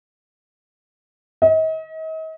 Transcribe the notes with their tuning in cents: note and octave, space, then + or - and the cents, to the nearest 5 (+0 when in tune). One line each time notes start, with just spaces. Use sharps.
D#5 +40